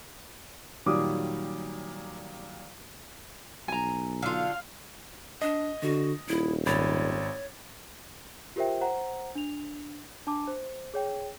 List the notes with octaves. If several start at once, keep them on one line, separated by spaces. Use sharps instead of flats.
A#2 D#3 F#3 G3 D6 D#6
B1 G#5 A#5
D3 F4 F5
D4 D#5
D3 F#4
D#1 E4
G#1 C#5 B5 A6
F4 G4 A#4 C5 E5 G5
C5 F#5 A#5
D4 F7
D4 A5 D6
C5
G#4 C#5 G5